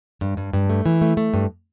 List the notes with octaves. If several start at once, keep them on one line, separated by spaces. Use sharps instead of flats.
G2
G2
G2
A3
E3
A3
A3
G2